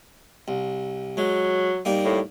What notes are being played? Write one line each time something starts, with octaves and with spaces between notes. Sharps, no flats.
C2
F#3 G#3
G3 A#3 D#4
A2